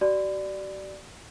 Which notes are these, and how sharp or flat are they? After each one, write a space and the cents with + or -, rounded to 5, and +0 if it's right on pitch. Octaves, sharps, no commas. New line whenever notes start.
F#4 +45 D5 +5 B5 +35